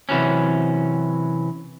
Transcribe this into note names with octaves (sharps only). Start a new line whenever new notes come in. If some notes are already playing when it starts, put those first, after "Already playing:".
C3 E3 F#3 C#4